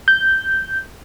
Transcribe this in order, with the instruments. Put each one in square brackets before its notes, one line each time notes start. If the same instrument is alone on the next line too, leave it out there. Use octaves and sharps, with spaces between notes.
[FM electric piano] G6